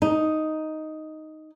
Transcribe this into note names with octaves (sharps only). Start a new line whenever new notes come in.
D#4